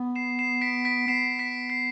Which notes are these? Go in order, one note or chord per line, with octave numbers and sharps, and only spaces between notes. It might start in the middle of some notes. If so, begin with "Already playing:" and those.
Already playing: B3
C7 E7
C7 E7
B6 D7
B6 D7
B3 C7 E7
B6 D7
C7